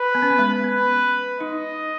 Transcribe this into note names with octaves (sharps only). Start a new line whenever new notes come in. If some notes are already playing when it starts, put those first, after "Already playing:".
Already playing: B4
B3
C#4
B3
G#3
B3 B4
D#4 D#5